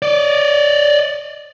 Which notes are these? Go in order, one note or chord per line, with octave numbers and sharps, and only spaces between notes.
C#5 D5